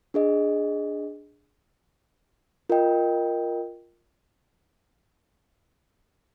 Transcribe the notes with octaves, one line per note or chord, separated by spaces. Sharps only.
D4 G#4 D#5
F4 A#4 D#5 G5